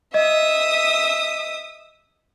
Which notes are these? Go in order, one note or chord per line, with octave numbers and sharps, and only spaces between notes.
D#5 E5 D#6